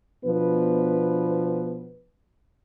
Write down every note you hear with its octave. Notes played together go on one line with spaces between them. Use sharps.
B2 F3 B3 D4 B4